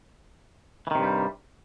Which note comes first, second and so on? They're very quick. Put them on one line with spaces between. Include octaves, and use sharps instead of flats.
E3 D#3 C3 G2 G3